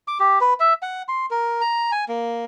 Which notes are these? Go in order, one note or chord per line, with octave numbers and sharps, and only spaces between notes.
D6
G4
B4
E5
F#5
C6
A#4
A#5
G#5
A#3